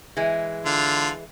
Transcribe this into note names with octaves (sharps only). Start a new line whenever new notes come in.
E3 G#3
D3 F4